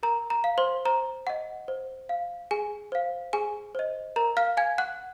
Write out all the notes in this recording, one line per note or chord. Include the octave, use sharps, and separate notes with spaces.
A#4 A#5
A#5
F5
C5 C6
C5 A#5
D#5 F#5
C5
F5
G#4 G#5
C5 F5
G#4 G#5
C5 D#5
A#4 A#5
F5 F6
F5 G#5 G#6
F#5 F#6